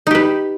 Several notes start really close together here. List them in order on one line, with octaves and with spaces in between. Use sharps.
D#4 G4 B4